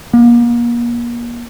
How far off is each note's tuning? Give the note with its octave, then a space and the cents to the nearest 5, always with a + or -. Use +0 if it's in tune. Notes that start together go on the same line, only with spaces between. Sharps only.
A#3 +35